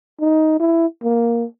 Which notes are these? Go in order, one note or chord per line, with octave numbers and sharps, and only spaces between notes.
D#4
E4
A#3